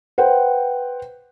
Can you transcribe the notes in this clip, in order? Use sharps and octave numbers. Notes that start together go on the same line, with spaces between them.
B4 C5 F#5 G5